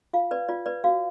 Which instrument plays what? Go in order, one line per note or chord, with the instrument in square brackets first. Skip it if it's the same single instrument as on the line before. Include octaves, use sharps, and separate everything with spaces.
[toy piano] F4 F5
B4 D5
F4 D5
B4 D5
F#4 F5